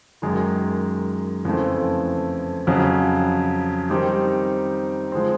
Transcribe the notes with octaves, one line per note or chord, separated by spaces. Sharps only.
F#2 D#3 G#3
F2 C#3 E3 A3 C4
F2 C#3 F#3
D#3 G3 C4 D#4 G4
F3 G#3 C4